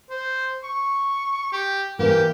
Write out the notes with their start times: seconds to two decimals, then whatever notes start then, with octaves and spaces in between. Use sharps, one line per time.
0.10 C5
0.63 C#6
1.53 G4
1.99 E3 A#3 G4